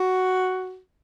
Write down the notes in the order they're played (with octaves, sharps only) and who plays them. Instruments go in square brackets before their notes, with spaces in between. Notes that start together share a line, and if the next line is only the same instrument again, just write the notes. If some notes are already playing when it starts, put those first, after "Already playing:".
Already playing: [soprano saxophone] F#4